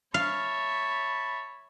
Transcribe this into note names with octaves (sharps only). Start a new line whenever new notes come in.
C#5 E5 F5 A5 B5